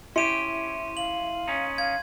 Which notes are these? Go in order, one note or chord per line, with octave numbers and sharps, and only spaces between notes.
C#4 E4 G4 C6 D#7
F5 F#7
C#4 D#4
F5 G#6